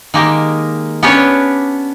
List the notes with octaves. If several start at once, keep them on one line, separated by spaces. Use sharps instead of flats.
D#3 G#3 A#3 G4
B3 C#4 D4 G4 B4 C#5